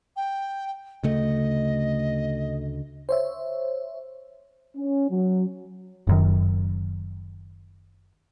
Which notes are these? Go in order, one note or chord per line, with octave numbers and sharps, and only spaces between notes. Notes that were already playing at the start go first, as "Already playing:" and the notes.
G5
D2 C#3 A3 D#5
C5 C#5 E5
C#4
F#3
F#1 F#2 D#3